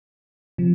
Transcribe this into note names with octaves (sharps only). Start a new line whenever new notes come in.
C3 F3